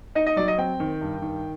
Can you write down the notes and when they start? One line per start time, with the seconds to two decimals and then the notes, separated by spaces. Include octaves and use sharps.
0.15 D#4 D#5
0.27 D#5
0.36 F#3 D5
0.48 D#5
0.58 C4 G5
0.80 D#3
1.01 G2
1.22 D#3